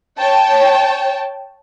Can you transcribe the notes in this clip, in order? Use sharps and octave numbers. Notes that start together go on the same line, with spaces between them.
C#5 G5 A5